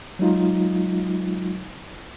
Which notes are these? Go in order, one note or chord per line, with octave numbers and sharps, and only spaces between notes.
F#3 G#3 D#4 F4